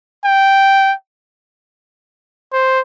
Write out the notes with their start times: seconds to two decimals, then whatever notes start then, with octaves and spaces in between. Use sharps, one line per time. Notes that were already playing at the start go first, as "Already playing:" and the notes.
0.25 G5
2.53 C5